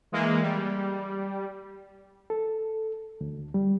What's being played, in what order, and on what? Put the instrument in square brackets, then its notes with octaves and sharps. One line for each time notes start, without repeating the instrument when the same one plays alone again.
[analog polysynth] E3 G#3 A#3
G3
[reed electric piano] A4
D2
G3